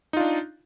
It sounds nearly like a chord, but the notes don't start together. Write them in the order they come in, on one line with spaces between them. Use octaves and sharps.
D#4 F4 D4